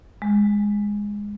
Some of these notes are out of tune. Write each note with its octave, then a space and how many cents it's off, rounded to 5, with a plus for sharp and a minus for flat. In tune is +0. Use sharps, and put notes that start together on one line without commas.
G#3 -10